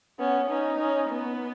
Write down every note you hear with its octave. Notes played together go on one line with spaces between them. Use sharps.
B3 C#4
C#4 D#4
C#4
B3